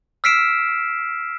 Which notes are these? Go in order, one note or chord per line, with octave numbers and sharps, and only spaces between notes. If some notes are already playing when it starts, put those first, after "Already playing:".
E6 F6 B6 C7 D7 E7